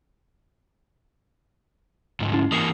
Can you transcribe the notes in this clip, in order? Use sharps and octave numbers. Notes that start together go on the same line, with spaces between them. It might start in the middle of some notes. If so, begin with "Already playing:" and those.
D2 G#2
C#4 E4
E3 A#3 D#6 C7 C#7